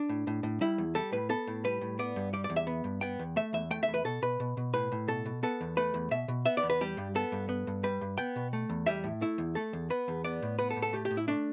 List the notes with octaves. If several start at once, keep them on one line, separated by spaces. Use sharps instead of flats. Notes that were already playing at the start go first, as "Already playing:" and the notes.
Already playing: D4
A2
A2
A2
G3 E4
E2
G3 A4
A2 B4
B3 A4
A2
G3 B4
A2
B3 D5
G2
G3 D5
D5
E2
E5
B3
G2
B3 G5
E2
A3 E5
E2 E5
A3 G5
E5
E2
B4
B2 A4
B2 B4
B2
B2
A2 B4
A2
B2 A4
B2
B3 A4
E2
A3 B4
E2
B2 E5
B2
B3 E5
D5
E2
B4
G3 G4
G2
B3 A4
G2
B3
G2
G3 B4
G2
B3 G5
B2
A3
E2
G3 E5
A2
A3 E4
E2
A3 A4
E2
B3 B4
E2
B3 D5
A2
B3 B4
A4
A2
A4
A3 G4
G4
A2
E4
A3 D4